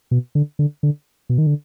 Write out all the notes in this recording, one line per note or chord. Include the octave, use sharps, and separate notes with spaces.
B2
D3
D3
D3
B2
D#3
D3